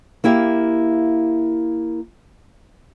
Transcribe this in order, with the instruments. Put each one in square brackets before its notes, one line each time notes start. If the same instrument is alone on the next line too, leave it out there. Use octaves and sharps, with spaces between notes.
[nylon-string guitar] A#3 E4 G4 E5 F5